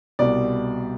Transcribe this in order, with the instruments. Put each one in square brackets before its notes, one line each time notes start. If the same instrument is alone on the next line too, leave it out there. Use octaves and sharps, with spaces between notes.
[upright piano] C2 B2 G3 D5